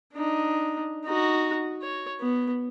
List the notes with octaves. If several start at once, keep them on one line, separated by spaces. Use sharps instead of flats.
D4 D#4
D#4 F#4
C#5
B3